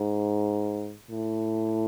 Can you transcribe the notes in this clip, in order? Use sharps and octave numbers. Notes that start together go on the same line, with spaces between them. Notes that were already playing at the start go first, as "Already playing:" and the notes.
Already playing: G#2
A2